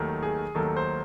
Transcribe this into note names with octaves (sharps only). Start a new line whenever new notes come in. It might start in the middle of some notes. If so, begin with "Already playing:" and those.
Already playing: D#2 D#3 F#3 A3
G#4
D#2 D#3 F#3 A3 A4
C5